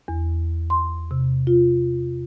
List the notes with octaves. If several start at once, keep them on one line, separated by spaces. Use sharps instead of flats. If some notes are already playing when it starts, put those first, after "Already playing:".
E2
C6
C3
F4